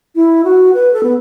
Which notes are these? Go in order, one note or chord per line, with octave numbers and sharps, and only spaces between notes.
E4
F#4
B4
A4
B3